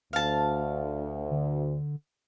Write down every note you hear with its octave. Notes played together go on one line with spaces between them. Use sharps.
D2 F5 A5
D3